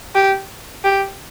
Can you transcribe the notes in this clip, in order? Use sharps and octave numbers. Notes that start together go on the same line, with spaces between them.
G4
G4